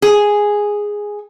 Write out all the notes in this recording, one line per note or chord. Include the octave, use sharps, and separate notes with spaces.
G#4